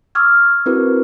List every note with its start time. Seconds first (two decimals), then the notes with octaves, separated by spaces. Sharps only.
0.15 C#6 D6 E6 F6 G#6
0.66 C4 E4 F#4 A#4 B4